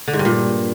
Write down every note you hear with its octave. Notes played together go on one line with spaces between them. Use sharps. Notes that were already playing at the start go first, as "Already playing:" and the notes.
D3
G#2
G2
A#2